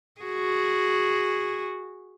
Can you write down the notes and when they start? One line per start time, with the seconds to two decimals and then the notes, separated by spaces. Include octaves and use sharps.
0.22 F#4 G#4